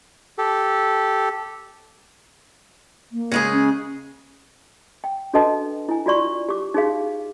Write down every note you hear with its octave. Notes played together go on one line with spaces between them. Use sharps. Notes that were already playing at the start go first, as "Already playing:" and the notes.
G4 A4
A#3
C#3 G#3 G#4
C#4
G5
D4 F#4 A4 B4 D#5 A5
E4 G#5
F4 F#4 D5 C#6
G4 D6
D#4 F#4 G#4 F5